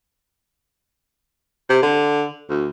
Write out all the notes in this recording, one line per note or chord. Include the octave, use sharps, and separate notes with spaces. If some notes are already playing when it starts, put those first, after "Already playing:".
C3
D3
D2